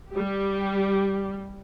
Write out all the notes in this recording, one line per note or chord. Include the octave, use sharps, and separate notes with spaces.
G3 G4